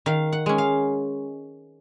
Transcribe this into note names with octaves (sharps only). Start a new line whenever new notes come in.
D#3 F5
F#5
G#3 C#4
F5